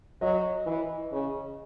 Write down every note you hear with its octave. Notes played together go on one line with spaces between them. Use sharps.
F#3 D#5
E3
C#3